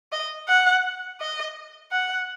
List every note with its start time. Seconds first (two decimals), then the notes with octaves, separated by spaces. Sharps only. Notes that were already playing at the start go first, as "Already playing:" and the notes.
0.12 D#5
0.49 F#5
1.20 D#5
1.92 F#5